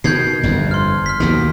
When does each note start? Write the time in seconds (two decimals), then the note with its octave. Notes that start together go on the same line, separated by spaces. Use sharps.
0.04 B2 D#3 G6 G#6 C7
0.43 G1 F2
0.71 C6 F6
1.06 F6 B6
1.20 D#2 B2 D#3